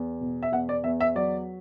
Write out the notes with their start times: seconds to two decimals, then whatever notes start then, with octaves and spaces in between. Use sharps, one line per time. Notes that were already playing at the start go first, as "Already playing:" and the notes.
Already playing: E2
0.21 B2
0.43 E5
0.52 E2 F#5
0.69 D5
0.84 E2 E5
1.00 E5
1.15 F#3 D5